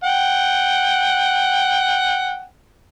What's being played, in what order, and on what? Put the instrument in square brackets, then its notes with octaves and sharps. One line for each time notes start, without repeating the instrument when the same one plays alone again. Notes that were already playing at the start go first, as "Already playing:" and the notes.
[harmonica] F#5 G5